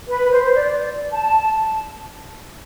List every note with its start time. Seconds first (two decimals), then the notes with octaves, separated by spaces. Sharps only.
0.08 B4
0.31 C5
0.55 D5
1.13 A5